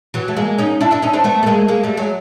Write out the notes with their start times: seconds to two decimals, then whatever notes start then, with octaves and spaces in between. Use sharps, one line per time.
0.14 E3 F#3
0.28 A3
0.37 G#3 A#3
0.58 C#4 D#4
0.81 D4 E4
0.91 D4 E4
1.02 C#4 D#4
1.13 C4 D4
1.24 A3 B3
1.43 A3
1.46 G#3 A#3
1.68 G#3 A#3
1.83 G3 A3
1.97 F#3 G#3